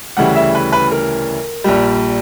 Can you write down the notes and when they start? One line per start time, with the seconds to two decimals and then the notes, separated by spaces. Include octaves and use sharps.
0.17 D2 C#3 E3 G3 F#5
0.36 E5
0.55 B4
0.72 B4
0.91 A#4
1.64 A#1 A#2 G3